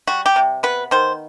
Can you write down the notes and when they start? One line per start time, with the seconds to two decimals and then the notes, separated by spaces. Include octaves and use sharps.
0.07 G3 F#4
0.26 G4
0.36 C3
0.63 B3 B4
0.91 D#3 C5